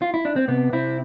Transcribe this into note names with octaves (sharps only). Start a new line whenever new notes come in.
F4
E4
D4
C4
C3 B3
C3 C4 E4